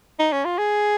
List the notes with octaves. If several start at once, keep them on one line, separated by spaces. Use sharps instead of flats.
D#4
C#4
F4
G#4